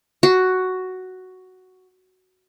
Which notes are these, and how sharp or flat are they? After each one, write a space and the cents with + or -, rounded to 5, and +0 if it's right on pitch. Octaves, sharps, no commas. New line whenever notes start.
F#4 +5